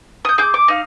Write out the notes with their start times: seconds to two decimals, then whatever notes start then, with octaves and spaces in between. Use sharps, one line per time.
0.25 D#6 G6
0.38 G#4 D6 G6
0.54 D6
0.68 D#4 F5